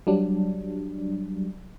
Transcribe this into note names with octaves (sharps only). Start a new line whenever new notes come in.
F#3 G3 D4